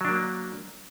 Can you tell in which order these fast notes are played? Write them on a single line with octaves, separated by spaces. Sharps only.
F#3 D4 A#3